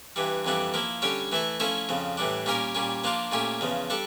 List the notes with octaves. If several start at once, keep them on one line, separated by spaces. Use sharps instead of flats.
G2 E3 G3
F2 E3 G3 D4
F3 A#3 E4
D3 G3 C#4 G4 C#5
E3 A3 E4 A4
F3 A3 C#4 E4 A4
F2 C#3 F3
A2 E3 G3 D4
A#2 G3 C#4 G4 A#4
A#2 G3 C#4
F3 A#3 D4 F4
A#2 A3 C#4 G4
E2 C#3 F3
G3 D4 A4